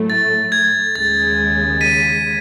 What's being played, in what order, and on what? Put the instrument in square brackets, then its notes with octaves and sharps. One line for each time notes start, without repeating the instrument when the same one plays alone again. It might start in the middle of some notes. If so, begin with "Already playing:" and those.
Already playing: [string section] A2 F#3 A3
[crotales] A6
G#6
[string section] D#2 C#3 G#3 [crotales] A6
[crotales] B6 D#7